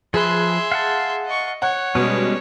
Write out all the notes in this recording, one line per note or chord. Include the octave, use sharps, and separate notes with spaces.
F3 G#4 B4 E5 C6
F5 F#5 A5
D#5 C#6
C#5 F#5
B2 G3 G#3 C#4